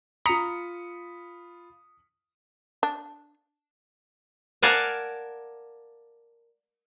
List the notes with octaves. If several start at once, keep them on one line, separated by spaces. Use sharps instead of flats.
F4 A#5 B5 D#6 B6 C#7
D4
A#4 D5 F5 F#5 G#5 A5